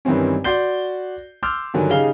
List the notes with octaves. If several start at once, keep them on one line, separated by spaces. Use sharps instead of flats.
G2 D#3 E3 C4 C#4
F#4 D5 C6 G6 C7 G7
C6 D6 E6 F6 G6
G2 D3 D#3 F#3 G#5
C#3 D#4 G4 G#4 F5 G7